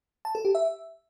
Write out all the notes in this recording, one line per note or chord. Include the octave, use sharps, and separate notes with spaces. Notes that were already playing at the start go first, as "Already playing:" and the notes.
A5
A4
G4
E5